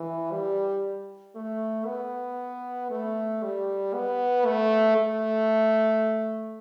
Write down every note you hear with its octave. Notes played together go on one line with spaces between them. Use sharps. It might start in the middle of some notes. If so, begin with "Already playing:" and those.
Already playing: E3
G3
A3
B3
A3
G3
B3
A3
A3